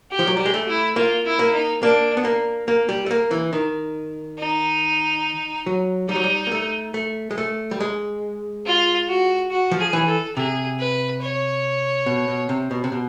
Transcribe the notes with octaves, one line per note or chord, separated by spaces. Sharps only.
G4
F3
F#3
G3 G4
G#3
A3
E4
A#3 F4
E4
A#3
D#4
A#3 D4
B3
A#3
A#3
G3
A3
A#3
E3
D#3
D#4
F#3
G3 D#4
F#3
G3
A#3
A3
A3
G#3
A3
G3
G#3
F4
F#4
F#4
F3
G#4
E3
A4
C3 G#4
B4
C#5
B2
B2
C3
B2
C3
B2